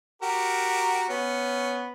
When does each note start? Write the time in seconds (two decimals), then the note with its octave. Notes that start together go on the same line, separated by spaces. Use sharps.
0.22 F#4 G4 A#4
1.09 B3 C#4